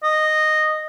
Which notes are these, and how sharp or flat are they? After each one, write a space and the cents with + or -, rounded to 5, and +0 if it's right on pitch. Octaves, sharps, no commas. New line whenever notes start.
D#5 -10